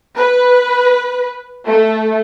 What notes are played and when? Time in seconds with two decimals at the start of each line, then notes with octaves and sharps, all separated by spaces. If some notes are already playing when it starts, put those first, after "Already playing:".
0.16 B4
1.67 A3